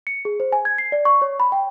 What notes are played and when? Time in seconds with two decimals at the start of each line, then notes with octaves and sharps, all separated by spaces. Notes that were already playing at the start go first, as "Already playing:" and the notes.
0.07 C#7
0.25 G#4
0.40 C5
0.52 G#5
0.65 G#6
0.78 C7
0.92 D5
1.05 C#6
1.22 C#5
1.40 B5
1.52 G5